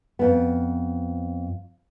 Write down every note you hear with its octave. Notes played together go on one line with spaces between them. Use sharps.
F2 B3